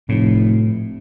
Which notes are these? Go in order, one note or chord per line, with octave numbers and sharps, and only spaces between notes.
F1 A2